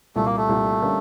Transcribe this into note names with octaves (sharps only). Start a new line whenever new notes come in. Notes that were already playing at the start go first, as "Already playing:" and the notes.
C2 A#2 G3 A3
A#3
A3
C2 A#2 G3
D3 G3 A#3 C#4